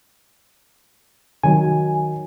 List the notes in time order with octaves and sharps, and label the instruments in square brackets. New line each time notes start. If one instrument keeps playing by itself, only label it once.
[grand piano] D#3 F#3 [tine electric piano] G#5